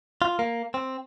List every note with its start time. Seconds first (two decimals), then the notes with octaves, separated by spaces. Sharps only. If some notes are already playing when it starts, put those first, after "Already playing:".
0.22 F4
0.39 A#3
0.74 C4